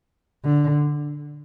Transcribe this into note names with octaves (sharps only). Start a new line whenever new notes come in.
D3